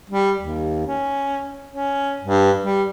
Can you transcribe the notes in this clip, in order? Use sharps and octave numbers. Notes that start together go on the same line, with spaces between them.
G3
D#2
C#4
C#4
G2
G3